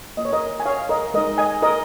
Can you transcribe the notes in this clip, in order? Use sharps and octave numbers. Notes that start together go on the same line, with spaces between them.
A#3 F4 D#5
C#5
A#4 D#5
G#5
C#5 F5
A#4 D#5
G#3 D#4 A#4 D#5
D#5 G#5
A#4 D#5